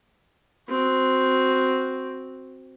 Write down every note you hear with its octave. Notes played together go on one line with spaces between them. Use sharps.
C4 F#4